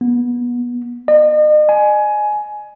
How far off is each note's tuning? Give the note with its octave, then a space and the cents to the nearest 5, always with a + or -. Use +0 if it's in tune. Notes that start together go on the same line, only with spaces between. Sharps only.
B3 -25
D#5 -40
G#5 +15